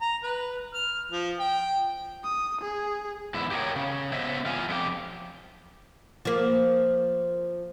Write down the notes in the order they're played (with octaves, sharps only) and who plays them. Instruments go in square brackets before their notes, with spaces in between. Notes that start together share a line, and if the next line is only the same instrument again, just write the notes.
[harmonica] A#5
B4
F6
F3
G5
[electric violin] D#6
G#4
[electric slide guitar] E2 G#2 E4
G4 G#4 A#4 C#5 G5
C#3
B3 C5 D#5 E5
E2 F4 F5 G#5
F2 E4 G4
[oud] F3 A#3